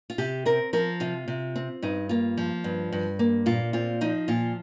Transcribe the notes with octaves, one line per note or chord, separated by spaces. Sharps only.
F4
C3 G4
C4 A#4
F3 A#4
C3 F4
C3
C4
G2 D#4
A#3 F4
F3
G2
G2
A#3
A#2 F4
C4 F4
F3 D#4
A#2 F4